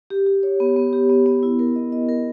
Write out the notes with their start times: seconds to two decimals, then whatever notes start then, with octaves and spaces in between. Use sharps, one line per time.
0.10 G4
0.26 G4
0.43 C#5
0.60 B3
0.76 B3
0.93 G4
1.10 B3
1.26 B3
1.43 E4
1.59 A#4
1.76 D#5
1.92 D#5
2.09 A#4